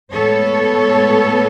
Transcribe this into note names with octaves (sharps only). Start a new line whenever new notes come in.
A2 G#3 B3 A4 C#5